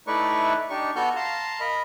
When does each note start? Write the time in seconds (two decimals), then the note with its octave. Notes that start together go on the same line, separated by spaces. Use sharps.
0.07 A3 D#4 E4 B4 D5 C#6
0.70 D4 D#4 G4 C#6
0.96 B3 F#4 A4 C#6 F6 G6
1.16 F5 A5 A#5 C6
1.60 A#4 D#5 A#5 B5